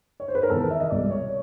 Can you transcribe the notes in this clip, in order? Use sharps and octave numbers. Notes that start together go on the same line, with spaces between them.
C#5
C5
B4
A#4
E2 C3 D#3 A4
A#4
E5
D#5
C2 B2 G#3 D5
C#5